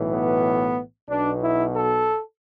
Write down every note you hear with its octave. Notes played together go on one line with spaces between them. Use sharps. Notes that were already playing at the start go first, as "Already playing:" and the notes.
Already playing: B1 A2 E3
B3
B1 B2 D4
E4
A4